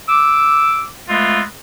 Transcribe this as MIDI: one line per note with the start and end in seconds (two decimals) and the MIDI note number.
0.09 0.83 86
0.09 0.83 88
1.08 1.42 56
1.08 1.42 57
1.08 1.42 59
1.08 1.42 60
1.08 1.42 65